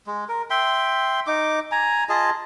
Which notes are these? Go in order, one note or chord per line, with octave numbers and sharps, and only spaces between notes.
G#3
A#4
E5 G5 C6
D#4 D6
G#5 A#5
F4 G#4 D#5 A5